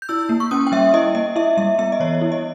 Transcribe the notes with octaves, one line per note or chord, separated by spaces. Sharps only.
G6
E4 E6
A#3
C#6
C#4 D#6
G5
G3 E5
E4 D#5
A#3 D#5
E4 E5
G3 E5
B3 E5
D#5
E3 C#5
E4
D#5